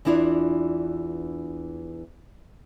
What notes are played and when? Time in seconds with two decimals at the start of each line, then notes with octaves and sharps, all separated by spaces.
0.05 E2 E3 D4 E4 F4